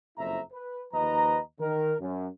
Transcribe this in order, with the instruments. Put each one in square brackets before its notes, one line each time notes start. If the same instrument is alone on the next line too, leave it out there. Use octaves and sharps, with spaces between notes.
[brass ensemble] F#1 F2 C4 E4 E5 A#5
B4
D#2 F3 D#4 B4 D#5 A#5
D#3 A#4
F#2